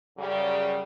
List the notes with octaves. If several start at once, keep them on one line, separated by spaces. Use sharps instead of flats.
F#2 C#3 G3